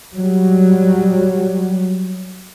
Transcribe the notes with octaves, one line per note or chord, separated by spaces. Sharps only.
F#3 G3